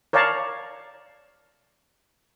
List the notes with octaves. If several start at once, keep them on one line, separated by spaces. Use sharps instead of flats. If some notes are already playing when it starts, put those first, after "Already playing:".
A#4 C#5 D5 F5 A5 A#5